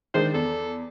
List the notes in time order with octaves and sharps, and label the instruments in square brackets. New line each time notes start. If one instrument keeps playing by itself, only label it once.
[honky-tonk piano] D#3 G#3 D4 [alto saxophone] C5
[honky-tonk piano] E2 [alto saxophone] A4